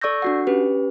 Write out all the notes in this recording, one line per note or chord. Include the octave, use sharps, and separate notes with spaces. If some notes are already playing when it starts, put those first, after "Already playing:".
A4 D5 C#6 E6 G6 A#6
D4 F#4 F#5
C#4 G4 B4